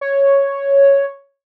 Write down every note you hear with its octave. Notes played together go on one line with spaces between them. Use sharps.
C#5